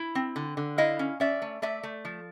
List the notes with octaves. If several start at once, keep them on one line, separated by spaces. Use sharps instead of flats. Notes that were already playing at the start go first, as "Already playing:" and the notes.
Already playing: E4
C4
D3
D3
E4 D#5 F5
C#4
C#4 D5 E5
A3
A3 D5 E5
A3
F3